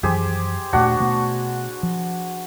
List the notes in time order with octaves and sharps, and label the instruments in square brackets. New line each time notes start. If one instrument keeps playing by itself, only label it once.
[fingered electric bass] F#2 E3 F3 [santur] G4 G#4 C5
[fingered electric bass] D#1 A#2 A3 [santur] D4 F#4 F#5
[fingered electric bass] B2 A3 B3
F3